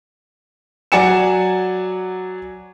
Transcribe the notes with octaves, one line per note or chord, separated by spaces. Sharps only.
F#3 D5 F#5 G#5 C#7 E7